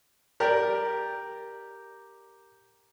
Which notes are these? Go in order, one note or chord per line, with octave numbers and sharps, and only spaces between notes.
G4 A#4 D5